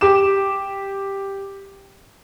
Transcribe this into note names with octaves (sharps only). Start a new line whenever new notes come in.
G4 D6 E7